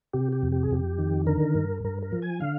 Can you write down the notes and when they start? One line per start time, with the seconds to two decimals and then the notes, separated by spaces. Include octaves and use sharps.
0.13 C3 G4
0.32 G4
0.43 F2
0.52 G4
0.63 G#4
0.71 F2 G4
0.98 D#3
1.27 D3 A#4
1.55 G2
1.84 G2 A#4
2.02 A#4
2.12 F3
2.22 G#5
2.40 D3 F5